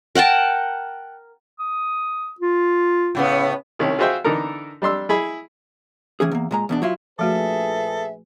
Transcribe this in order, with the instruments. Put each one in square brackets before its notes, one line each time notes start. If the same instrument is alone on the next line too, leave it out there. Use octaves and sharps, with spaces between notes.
[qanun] A#4 F#5 G5 A5
[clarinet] D#6
F4
[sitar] A2 C#3 B3
[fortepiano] C2 D#3 C#4
F4 F#4 G#4 C5 E5 G5
D3 E3 D#4 A4 A#4
G3 D4 C6 E6
E4 G#4 B5
[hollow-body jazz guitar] A2 E3 C#4 G#4
E2 A#3
A#2 G#3 A#5
E2 B2 D4
F#3 E4 F4
[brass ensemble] A#1 G#4 B4 [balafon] F3 A3 F#4 [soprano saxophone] A4 [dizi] E5